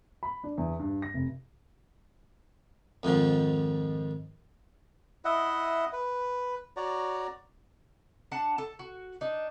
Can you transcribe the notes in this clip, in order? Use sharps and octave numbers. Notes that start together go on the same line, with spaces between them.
B5
D4
E2
G2
A#6
F1
F2 G#2 D#3 F3
E4 D#5 E5 F#5
B4
F#4 C#5 D5 A#5
D4 F#5 A5
A4
F#4
D4 D#4